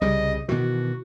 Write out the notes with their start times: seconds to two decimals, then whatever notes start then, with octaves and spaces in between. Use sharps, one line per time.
0.01 C2 C#3 G3 D#5
0.49 B2 D#3 E3 F#4